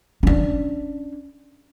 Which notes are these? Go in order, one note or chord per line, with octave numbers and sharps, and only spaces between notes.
C#4 D4